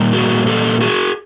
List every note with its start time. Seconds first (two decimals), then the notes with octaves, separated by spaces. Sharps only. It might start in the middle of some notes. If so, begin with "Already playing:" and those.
Already playing: A#2 G3 A#3
0.13 F#4 G#4
0.46 G4 A4
0.80 F#4 G#4